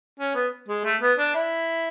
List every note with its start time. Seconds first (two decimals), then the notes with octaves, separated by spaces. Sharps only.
0.19 C#4
0.35 B3
0.68 G#3
0.84 A3
1.01 B3
1.18 D4
1.35 E4